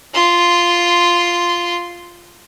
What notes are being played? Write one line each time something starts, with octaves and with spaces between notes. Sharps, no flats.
F4 C6